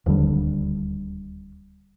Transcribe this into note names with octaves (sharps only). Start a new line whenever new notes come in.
D1 D#2 D3 G3